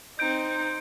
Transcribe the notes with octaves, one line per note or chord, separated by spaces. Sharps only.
C4 D#4 G6 D7